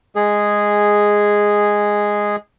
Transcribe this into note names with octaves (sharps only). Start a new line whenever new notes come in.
G#3 G#4